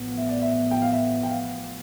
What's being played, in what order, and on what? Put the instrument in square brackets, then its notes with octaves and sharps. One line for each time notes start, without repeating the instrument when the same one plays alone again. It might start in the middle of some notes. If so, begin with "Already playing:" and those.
Already playing: [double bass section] A1 A2 F3 B3
[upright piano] E5
D5
E5
G5
F5
E5
G5
F5